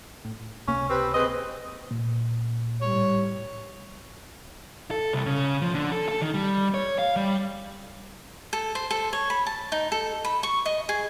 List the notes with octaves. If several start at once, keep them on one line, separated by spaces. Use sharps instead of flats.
A2
C#2 C3 A#3 C#4
C4 G4 B4
C4 G#4 B4 D#5
A#2
A2 G3 C#5
A4
C2
C#3
F3
D3
A4
A4
D#3
G3
C#5
F5
G3
A4
C5
A4
C#5
B5
A5
D#4
A4
B5
C#6
D#5
G#4